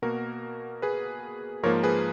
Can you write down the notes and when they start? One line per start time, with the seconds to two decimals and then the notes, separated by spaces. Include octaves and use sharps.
0.02 B2 A#3 F#4 A#4
0.82 G#4 B4
1.63 G#2 F3 A#3 A#4 C#5
1.83 G#4 B4